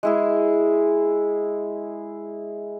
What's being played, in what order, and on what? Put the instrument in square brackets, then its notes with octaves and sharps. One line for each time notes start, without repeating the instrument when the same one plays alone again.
[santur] G#3 E4 G#4